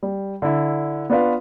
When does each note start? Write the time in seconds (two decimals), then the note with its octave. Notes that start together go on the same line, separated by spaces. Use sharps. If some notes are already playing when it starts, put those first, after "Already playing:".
0.03 G3
0.42 D3 E4
1.10 B3 D4 F4 B4 F5